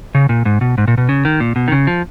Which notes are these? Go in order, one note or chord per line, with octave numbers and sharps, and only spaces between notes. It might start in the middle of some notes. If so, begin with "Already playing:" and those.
C#3
A#2
G#2
B2
G#2
A#2
B2
C#3
D#3
A#2
B2
D#3
C#3
F3